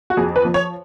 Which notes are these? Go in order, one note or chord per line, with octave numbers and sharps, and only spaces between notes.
F#4
F2 G#4
B4
F3
C#5